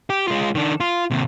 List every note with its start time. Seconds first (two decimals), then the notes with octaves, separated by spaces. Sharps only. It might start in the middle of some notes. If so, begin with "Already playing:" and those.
0.10 G4
0.28 G#3 F4
0.55 D#3 D4
0.80 F4
1.11 D#2 C3